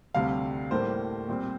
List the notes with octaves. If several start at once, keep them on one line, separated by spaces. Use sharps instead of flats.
D2 C3 G3 F5
A2 G3 A#3 C5
A#2 G3 C4